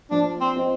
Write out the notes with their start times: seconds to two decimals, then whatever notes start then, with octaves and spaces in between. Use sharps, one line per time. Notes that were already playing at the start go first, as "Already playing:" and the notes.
0.11 F3 D4
0.41 C4
0.55 C4 F4 C5 D#5